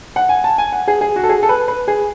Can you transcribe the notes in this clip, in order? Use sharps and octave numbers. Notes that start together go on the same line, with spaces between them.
F#5
G#5
A5
G#5
F#5
G#4
G#4
F#4
A4
G#4
A4
B4
B4
G#4